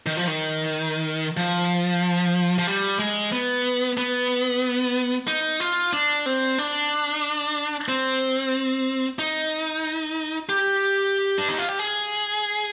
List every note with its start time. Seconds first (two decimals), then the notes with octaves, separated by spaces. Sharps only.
0.06 D#3
0.17 F3
0.27 D#3
1.37 F3
2.59 F3
2.67 G3
3.00 G#3
3.32 B3
3.97 B3
5.28 D#4
5.60 F4
5.93 D4
6.26 C4
6.58 D4
7.88 C4
9.19 D#4
10.49 G4
11.38 D4
11.48 D#4
11.58 F4
11.69 G4
11.79 G#4